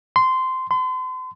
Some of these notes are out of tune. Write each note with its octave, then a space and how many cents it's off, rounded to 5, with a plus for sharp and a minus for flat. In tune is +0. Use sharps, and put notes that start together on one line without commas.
C6 -15
C6 -40